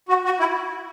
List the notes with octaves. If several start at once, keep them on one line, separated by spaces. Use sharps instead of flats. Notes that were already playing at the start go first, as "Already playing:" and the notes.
F#4
F#4
E4